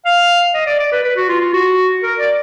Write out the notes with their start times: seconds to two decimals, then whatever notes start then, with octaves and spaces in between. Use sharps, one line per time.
0.05 F5
0.54 D#5
0.67 D5
0.80 D5
0.92 B4
1.04 B4
1.17 F#4
1.29 F4
1.41 F4
1.53 F#4
2.03 A#4
2.19 D5